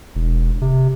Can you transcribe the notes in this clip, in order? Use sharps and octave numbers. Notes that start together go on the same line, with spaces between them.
E1
C3